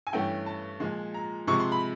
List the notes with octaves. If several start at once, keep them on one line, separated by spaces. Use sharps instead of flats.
G#5
G2 E3 A3 C#4 G5
A5
A#2 F3 G#3
A#5
C3 F3 G#3 C#6
C6
B5